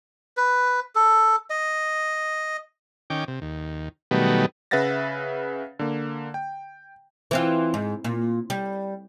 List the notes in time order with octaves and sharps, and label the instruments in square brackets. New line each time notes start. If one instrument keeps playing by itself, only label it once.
[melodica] B4
A4
D#5
[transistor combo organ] D#3 C#4 G5 D6
C3
D#2
B2 D#3 F#3 G3 A3 B3
[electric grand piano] C#3 B4 E5 F#5 A6 A#6
D3 A#3
G5
[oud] E3 C4 F4
G#2
A#2
G3